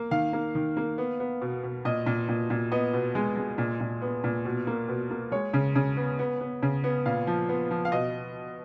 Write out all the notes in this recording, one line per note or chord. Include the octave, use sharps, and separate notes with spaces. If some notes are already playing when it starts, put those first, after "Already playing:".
Already playing: A#3
D#3 F5
A#3
D#3
A#3
B3
B3
B2
B2
A#2 D#5
A#2
A#2
A#2
B3 D#5
B2
G#3
G#3
A#2
A#2
B3
A#2
B2
A#3
B2
A#3
G#3 C#5
C#3
C#3
B3
B3
B3
C#3
B3
A#2 F5
F3
B3
F3
F5
B2 D#5